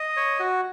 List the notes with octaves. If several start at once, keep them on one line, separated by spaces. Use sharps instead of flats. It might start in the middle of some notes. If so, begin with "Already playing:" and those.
Already playing: D#5
C#5
F#4